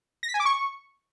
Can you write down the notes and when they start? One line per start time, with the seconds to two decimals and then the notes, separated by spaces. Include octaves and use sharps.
0.23 A#6
0.29 B6
0.34 G#5
0.40 D6
0.45 C#6